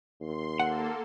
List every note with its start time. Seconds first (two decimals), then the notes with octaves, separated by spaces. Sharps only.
0.20 D#2 C6
0.59 A#3 A4 F#5